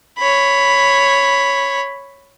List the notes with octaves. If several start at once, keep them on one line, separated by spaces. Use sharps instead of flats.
C#5 B5